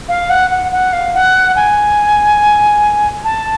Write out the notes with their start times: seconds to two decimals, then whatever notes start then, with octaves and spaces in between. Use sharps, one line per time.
0.09 F5
0.30 F#5
0.50 F#5
0.72 F#5
0.93 F5
1.14 F#5
1.56 G#5
3.24 A5